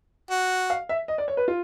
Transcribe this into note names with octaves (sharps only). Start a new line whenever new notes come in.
F#4
F5
E5
D#5
D5
C#5
B4
F4